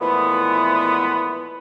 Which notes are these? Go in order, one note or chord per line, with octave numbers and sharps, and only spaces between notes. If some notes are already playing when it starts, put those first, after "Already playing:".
A#2 E3 F3 G#3 A3 B3